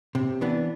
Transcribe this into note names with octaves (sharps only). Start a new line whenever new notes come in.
C3
E3 B3 D4